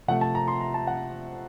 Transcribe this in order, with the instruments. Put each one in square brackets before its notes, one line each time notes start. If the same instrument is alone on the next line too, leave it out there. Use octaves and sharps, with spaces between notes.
[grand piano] C3 F3 A3 F#5
A5
A#5
C6
A#5
A5
F#5